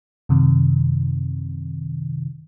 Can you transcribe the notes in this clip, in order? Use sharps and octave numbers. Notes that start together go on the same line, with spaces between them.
F#2 C3 D#3